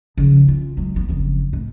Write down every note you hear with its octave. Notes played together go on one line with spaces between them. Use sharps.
C#3 F3
C#4 F4
F#3 G#3
B3
F#1 F2
A2